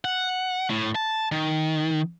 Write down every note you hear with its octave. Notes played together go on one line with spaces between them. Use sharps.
F#5
A2
A5
D#3